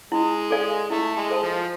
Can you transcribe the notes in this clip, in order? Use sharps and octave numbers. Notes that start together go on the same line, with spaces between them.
G#3 E4
A4 D5 F5 G#5
A3 E4
G#3
A4 C5 F5 A5
F3